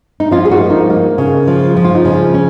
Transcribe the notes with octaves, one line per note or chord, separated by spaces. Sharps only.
D#4
F3 C#4 F4
G#4
D#4 F#4
A#3
D#4
A#3
C#3
F3
F3
F4
D#4
C#3 C#4
C#4